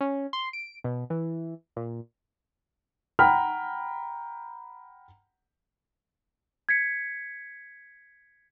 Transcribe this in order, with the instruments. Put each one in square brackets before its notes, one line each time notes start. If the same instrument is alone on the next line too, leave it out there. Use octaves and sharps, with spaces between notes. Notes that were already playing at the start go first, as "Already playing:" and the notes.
[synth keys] C#4
C6
D7
B2
E3
A#2
[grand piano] F#5 G5 A#5 B5 F6
[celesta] G#6 B6 C#7